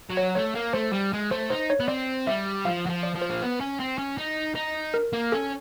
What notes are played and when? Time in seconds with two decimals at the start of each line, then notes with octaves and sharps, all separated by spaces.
0.10 F#3
0.17 C#5
0.35 A3 C#5
0.55 A#3
0.73 A3 C5
0.92 G3
1.13 G#3
1.31 A3 C5
1.50 D#4 C5
1.70 C#5
1.80 B3
1.88 C4 D5
2.27 G3 E5
2.65 F3 F5
2.86 F#3
2.90 F3
3.03 D5
3.16 F3
3.22 C5
3.30 A#3
3.42 B3
3.61 C#4
3.80 C4
3.98 C#4
4.18 D#4
4.55 D#4
4.94 A#4
5.13 A#3
5.32 C#4 A4